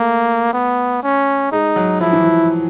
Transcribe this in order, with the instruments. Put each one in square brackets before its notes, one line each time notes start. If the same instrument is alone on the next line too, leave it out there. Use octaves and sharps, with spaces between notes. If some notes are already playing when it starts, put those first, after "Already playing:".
Already playing: [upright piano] A3 [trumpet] A#3
[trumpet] B3
C#4
[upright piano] G#3 [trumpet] D#4
[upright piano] F#3
[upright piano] F3 [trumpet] E4
[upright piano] E3
F3